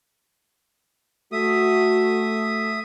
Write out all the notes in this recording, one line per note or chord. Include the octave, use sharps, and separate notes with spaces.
A3 F#4 E5 D#6